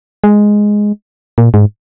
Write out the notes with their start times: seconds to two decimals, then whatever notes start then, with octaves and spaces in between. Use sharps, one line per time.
0.24 G#3
1.38 A#2
1.54 G#2